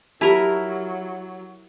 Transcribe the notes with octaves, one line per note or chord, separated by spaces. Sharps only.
F#3 E4 F4 G4 A#4 A5